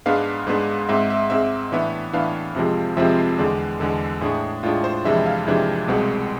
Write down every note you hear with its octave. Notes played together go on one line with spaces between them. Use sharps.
G#2 G#3 B3 D4 F5
G#2 G#3 B3 D4
G#2 G#3 C4 E5
E5
G#2 G#3 C4 E5
A2 E3 B3 D4 E5
A2 E3 B3 D4 F5
F2 C3 F3 G#3 C4
F2 C3 F3 G#3 C4 E5
E2 D3 G#3 D5
E2 D3 G#3 A4
A2 G#3 D4 G#4
A2 G#3 D4 F4
C5
F2 C3 E3 G#3 D4 E5
F5
F2 C3 E3 G#3 D4
C2 B2 G#3 C4